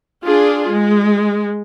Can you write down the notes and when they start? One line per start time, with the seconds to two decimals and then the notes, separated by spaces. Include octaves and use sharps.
0.23 D4 F4 G#4
0.69 G#3